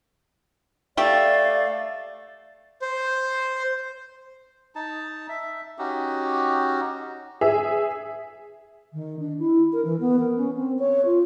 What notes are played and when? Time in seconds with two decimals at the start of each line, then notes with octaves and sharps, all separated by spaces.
0.97 A3 G4 D5 F5
2.82 C5
4.75 D#4 A5
5.29 E5
5.78 C#4 D#4 F#4 G4
7.41 G#4 E5
8.93 D#3
9.19 D4
9.38 E4
9.72 A#4
9.84 E3
10.00 B3
10.19 A#4
10.36 C#4
10.56 C4
10.78 C#5
11.05 F4